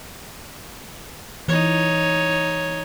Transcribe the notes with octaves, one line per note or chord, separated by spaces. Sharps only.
E3 D#4 C#5